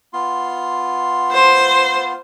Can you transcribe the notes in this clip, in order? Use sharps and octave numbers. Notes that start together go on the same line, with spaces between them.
B3 F4 C6
C5